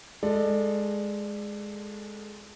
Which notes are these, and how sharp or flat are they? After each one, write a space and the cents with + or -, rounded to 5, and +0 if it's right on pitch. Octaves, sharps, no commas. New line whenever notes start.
G#3 +0 A4 +0 D5 +20